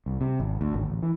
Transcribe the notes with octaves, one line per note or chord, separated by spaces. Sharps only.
C2
C3
G#1
D2
G#1
A1
E3